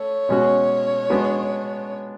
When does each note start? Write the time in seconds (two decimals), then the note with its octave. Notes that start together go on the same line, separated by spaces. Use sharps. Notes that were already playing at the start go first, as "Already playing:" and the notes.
Already playing: A3 C#5
0.29 B2 G#3 C#4 F#4
1.10 G#3 B3 D4 F#4 B4